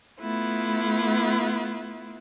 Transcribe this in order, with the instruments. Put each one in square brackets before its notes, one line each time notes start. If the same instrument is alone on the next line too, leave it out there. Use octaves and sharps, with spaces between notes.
[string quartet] A3 B3 E4 F4